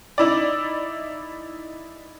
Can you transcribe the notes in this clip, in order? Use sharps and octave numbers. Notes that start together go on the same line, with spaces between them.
D#4 E4 D5